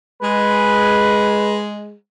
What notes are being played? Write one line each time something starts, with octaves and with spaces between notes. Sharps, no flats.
G#3 B4